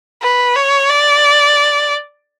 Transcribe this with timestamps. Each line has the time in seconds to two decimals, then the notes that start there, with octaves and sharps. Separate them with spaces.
0.22 B4
0.56 C#5
0.89 D5